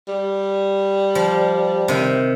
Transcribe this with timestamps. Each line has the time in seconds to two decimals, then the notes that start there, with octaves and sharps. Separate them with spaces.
0.08 G3
1.15 F3
1.88 C3 D#3